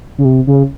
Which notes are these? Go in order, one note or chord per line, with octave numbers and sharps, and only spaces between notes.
C#3
C3
C#3